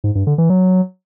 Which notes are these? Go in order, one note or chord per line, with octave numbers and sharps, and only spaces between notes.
G#2
G2
D3
E3
F#3